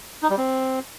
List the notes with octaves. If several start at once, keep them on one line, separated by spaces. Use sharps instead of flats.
D#4
G3
C4